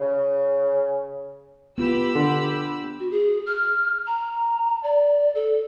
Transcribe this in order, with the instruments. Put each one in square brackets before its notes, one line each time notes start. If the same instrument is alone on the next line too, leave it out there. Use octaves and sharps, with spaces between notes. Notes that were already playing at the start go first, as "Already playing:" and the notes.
[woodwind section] C#3
[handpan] B3 F4 [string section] G4 B5 E6
[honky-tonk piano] D3
[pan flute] F#4
G#4
F6
A#5
D5
A4